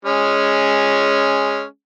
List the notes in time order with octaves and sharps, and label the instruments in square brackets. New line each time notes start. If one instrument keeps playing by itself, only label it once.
[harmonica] G#3 C#4